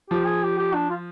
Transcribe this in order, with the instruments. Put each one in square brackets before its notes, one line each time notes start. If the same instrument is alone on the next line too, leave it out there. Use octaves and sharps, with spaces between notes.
[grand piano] F3 [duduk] G4
[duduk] G#4
G4
G4
D4
F4